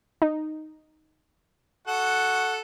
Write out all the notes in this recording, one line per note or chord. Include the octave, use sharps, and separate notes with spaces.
D#4
F#4 A4 F#5